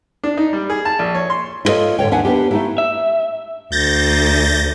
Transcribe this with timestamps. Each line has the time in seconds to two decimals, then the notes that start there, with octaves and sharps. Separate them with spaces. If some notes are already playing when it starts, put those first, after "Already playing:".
0.24 D4
0.37 D#4
0.53 G3
0.70 G#4
0.85 A5
0.99 A#1
1.15 C#5
1.30 C6
1.65 E4 F4 A4 C#5 D#5
1.99 G#2 D3 C#5 G5
2.11 D#2 D4 E5 F#5 G#5
2.25 B3 D4 G4
2.51 A3 D#4 E4
2.78 E5
3.72 D2 G6 A6 A#6